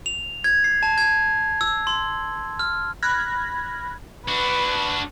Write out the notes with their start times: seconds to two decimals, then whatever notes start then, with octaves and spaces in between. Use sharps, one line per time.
0.06 F7
0.44 G#6
0.64 C7
0.83 A5
0.98 G#6
1.61 E6
1.87 C6
2.59 F6
3.02 B5 F6 F#6 G#6 A#6
4.28 D4 F#4 B4